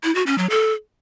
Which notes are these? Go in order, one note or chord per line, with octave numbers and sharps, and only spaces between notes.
E4
F#4
C#4
F#3
A4